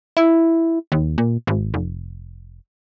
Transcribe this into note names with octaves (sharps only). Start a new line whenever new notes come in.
E4
D#2
A#2
G#1
F1